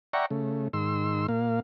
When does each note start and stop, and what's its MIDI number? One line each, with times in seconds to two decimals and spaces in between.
0.13 0.26 74
0.13 0.26 76
0.13 0.26 78
0.13 0.26 79
0.13 0.26 82
0.13 0.26 85
0.31 0.68 49
0.31 0.68 57
0.73 1.27 44
0.73 1.27 51
0.73 1.27 84
0.73 1.27 88
1.28 1.60 46
1.28 1.60 58
1.28 1.60 77